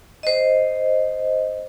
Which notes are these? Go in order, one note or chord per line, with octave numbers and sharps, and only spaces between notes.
C5 D#5